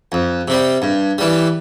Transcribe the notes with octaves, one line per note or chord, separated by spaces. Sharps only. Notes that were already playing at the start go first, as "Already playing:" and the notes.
F2
C3 G3
G2
E3 G3